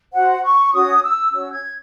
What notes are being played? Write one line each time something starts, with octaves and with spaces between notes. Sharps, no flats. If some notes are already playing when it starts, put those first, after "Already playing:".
F#4 C5 F#5
C#6
C#4 F#4 C#5 D#6
E6
C#4 F#4 C#5 E6
G#6